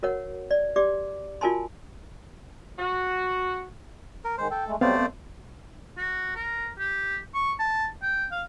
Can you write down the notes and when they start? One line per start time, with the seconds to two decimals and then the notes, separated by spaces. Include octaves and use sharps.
0.03 F#4 A#4 C#5 F#5
0.51 D5
0.76 G4 D5 D6
1.41 F4 F#4 A#4 G#5 A5 C6
2.79 F#4
4.25 A#4
4.38 D#3 G#3 C5
4.51 A4 G5
4.67 G#3 A3
4.81 F#3 G3 A3 B3 C4 C5 D5 F5
4.96 F#2
5.97 F#4
6.36 A#4
6.79 G4
7.34 C#6
7.59 A5
8.03 G5
8.32 F5